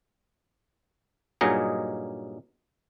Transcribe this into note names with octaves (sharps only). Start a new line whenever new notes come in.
G2 A#2 F#3 D#4 G#4 D#5